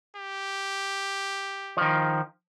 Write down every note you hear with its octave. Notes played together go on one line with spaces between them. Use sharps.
G4
D#3 F3